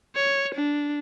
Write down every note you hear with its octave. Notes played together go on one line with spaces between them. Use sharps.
C#5
D4